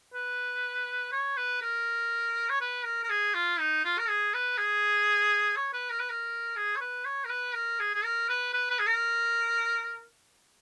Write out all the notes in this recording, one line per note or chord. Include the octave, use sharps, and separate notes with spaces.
B4
C#5
B4
A#4
C#5
B4
A#4
A#4
G#4
F4
D#4
F4
A#4
G#4
B4
G#4
C#5
B4
A#4
B4
A#4
G#4
C#5
B4
C#5
A#4
B4
A#4
G#4
G#4
A#4
B4
B4
B4
G#4
A#4